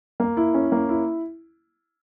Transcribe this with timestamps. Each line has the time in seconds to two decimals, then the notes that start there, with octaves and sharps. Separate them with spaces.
0.20 A#3
0.37 E4
0.54 C#4
0.72 A#3
0.89 E4